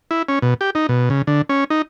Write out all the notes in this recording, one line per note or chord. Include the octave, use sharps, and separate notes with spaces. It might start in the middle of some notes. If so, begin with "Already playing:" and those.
E4
C#4
B2
G4
D#4
B2
C#3
D3
C#4
D#4